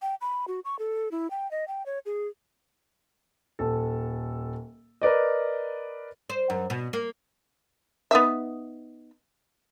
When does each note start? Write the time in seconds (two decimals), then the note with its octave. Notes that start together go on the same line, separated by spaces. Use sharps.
0.02 G5
0.21 B5
0.48 F#4
0.65 C#6
0.79 A4
1.12 E4
1.31 G5
1.51 D#5
1.68 G5
1.86 C#5
2.06 G#4
3.59 D#1 A4
5.02 A#4 B4 D5 D#5
6.30 C5
6.50 F#2
6.70 B2
6.93 A#3
8.11 B3 D#4 E5